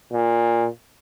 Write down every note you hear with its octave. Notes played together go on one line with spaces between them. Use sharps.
A#2